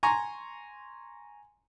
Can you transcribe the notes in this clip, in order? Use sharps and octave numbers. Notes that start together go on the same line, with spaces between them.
G#5 A#5 C6 C#6